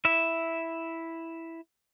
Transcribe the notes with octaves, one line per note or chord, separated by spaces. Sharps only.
E4 E5